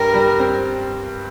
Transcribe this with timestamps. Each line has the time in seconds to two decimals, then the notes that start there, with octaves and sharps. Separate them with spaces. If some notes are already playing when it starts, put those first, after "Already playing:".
Already playing: G2 G3 A#4
0.14 G3
0.40 C4